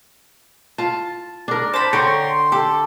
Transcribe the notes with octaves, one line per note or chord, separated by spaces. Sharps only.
F4 A5
D4 A#4
C5 A5 B5
D3 C#5 G5 A#5 C6
G4 A4